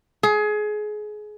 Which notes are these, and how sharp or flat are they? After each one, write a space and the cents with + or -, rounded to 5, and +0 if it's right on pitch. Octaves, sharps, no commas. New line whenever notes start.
G#4 +25